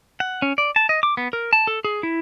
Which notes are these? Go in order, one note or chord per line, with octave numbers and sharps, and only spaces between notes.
F#5
C#4
D5
A5
D#5
D6
B3
A#4
A5
A4
G#4
E4